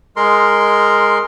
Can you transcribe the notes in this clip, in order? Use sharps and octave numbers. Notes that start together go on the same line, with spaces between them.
G#3 A#4 C6